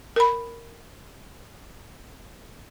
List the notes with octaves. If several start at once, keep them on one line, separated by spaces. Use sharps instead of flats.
A#4 B5